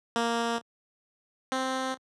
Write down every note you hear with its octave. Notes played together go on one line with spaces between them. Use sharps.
A#3
C4